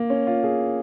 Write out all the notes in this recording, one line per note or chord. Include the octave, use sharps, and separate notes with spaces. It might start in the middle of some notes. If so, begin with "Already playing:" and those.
Already playing: A#3
C#4
F4
G#4